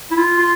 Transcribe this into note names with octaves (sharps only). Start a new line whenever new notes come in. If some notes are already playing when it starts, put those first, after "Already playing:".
E4
F4
F4